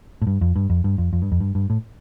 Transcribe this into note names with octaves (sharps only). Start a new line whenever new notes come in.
A2
G2
F2
G2
F2
G2
F2
F2
G2
F2
G2
G2
A2